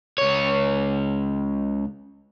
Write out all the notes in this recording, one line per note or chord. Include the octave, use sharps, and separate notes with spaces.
C#2 C#5